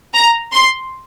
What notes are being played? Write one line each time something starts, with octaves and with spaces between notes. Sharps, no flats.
A#5
C6